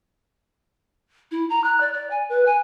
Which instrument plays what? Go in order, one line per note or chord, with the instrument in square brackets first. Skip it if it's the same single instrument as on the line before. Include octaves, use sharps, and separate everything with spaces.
[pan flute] E4
A#5
F#6
D5
D5
G#5
B4
G#5